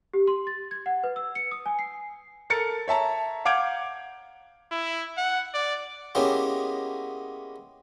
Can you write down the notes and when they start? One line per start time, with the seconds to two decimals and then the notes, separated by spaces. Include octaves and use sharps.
0.14 G4
0.27 C6
0.47 A6
0.71 G#6
0.86 F#5
1.04 B4
1.16 E6
1.35 C#7
1.51 D#6
1.66 G#5
1.79 C7
2.50 A4 A#4 A6 C#7
2.88 C#5 E5 A5 A#5
3.45 F5 F#5 D6 G6 G#6 D7
4.72 E4
5.17 F#5
5.54 D5
6.15 G#3 A#3 B3 C#4 E4 G4